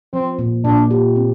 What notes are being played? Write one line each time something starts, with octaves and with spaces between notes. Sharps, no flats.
F3 C4
A#2
A#2 D4
G4
C4